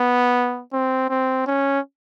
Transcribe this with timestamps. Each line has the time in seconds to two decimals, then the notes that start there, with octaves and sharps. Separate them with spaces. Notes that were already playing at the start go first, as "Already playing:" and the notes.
Already playing: B3
0.73 C4
1.09 C4
1.47 C#4